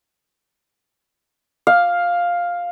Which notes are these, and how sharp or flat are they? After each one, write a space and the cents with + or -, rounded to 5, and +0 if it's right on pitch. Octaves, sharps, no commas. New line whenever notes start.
F5 +5